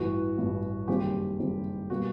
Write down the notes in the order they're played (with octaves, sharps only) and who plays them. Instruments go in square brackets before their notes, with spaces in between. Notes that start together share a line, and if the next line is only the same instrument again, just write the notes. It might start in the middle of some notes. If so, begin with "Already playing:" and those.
Already playing: [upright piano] A1 G2 E3 F#4
A1 G2 E3
F#1 F#2 D#3 G3 C4 G4
F#1 F#2 D#3 G3 C4
B2 G3 A#3 F#4